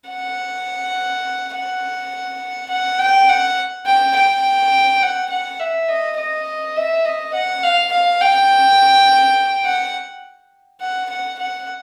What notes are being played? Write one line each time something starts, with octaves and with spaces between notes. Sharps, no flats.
F#5
F#5
F#5
G5
F#5
G5
G5
F#5
F#5
E5
D#5
D#5
E5
D#5
F#5
F5
F5
G5
F#5
F#5
F#5
F#5